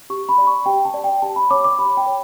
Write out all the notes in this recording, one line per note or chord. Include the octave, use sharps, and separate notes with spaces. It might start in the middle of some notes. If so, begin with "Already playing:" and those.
G4 C#6
B5
D5
C#6
G4 G5
A5
D5
G5
G4 A5
B5
C#5 D6
D6
G4 B5
G5
C#5